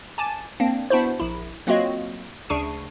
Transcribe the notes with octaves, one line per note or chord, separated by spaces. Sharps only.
G#5 A5 D6 A6 E7
A#3 C4 D4
B3 D4 E4 F#4 C5
A#1 E4
F#3 A#3 C4 F4 F#4 D#5
D2 C#3 D4 C#6 C7 D#7